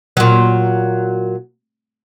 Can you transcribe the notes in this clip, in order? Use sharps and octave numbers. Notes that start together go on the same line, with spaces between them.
A#2 F#3